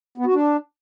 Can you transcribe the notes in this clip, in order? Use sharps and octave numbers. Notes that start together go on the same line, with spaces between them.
B3
F#4
D4